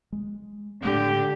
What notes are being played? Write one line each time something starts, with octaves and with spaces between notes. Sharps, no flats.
G#3
A2 D3 G#3 A3 G4